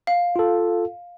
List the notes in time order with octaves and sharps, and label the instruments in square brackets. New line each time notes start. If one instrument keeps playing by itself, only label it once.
[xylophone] F5
[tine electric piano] F4 A4